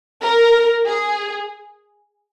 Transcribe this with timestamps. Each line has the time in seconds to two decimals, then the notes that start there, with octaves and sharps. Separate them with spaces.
0.22 A#4
0.86 G#4